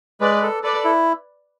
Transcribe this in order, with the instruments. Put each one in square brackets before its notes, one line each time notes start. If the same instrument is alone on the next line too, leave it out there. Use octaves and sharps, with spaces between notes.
[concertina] G#3 [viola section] B4 D5
[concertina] A4
[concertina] A4 [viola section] B4 D5
[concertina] E4